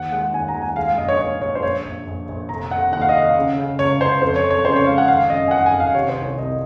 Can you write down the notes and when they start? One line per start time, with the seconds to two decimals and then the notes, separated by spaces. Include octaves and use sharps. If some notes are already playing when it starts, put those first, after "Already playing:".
Already playing: D#2 F#5
0.12 G#3 F#5
0.33 D#2 G#5
0.48 A#5
0.55 D#2
0.62 G#5
0.76 G#3 F5
0.88 F5
0.98 A#1 D#5
1.08 C#5
1.19 A#1 C#5
1.41 A#1 C#5
1.55 C5
1.63 A#1 C#5
1.85 A#1
2.07 A#1
2.28 A#1
2.49 F1 A#5
2.71 F1 F#5
2.92 D#2 F#5
3.01 F5
3.09 D#5
3.14 F1 F5
3.36 C#3
3.58 C#3
3.79 C#2 C#5
4.00 C#2 C5
4.21 F2 C5
4.36 C#5
4.44 F2
4.50 C#5
4.65 C#3 C5
4.76 C#5
4.86 G#3 F5
4.98 F#5
5.08 G#1 F5
5.30 F#2 D#5
5.48 G#5
5.51 G#1 F#5
5.66 G#5
5.73 G#1
5.80 F5
5.94 C3 C#5
6.09 C5
6.16 C2
6.24 C#5
6.37 C2 D#5